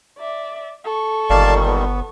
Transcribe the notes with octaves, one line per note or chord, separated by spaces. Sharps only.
D5 E5
A4 C#6
G1 A#2 D#3 G3 D5 F5 A5
B3